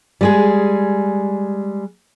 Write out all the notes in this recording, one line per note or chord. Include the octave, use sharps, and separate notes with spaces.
G3 G#3 G#4